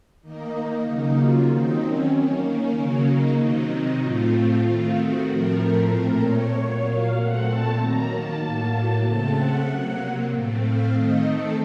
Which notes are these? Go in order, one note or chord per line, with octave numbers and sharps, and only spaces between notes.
D#3 A#3 D#4
C#3 F#3 A#3 D#4
F4
D#3 F#3 C4 D#4
C#4
D#3 A#3
C#4
C#3 F#3 A#3
D#4
C3 D#3 F#3 C4 D#4
A2 A3 C4 F4
F4
D#3 A3 C4
F#4
A2 F3 A3 C4 A#4
A#2 A3 C4
C#5
A#2 F#3 A#3
F5
A#2 A3 C4 F#5
A5
D#3 F#3 A#3 A#5
A5
A2 F#3 A#3
C#3 A3 C4
F#5
C3 F#3 A#3
A2 A3 C4
F5
D#3 A3 C4 D#5
A4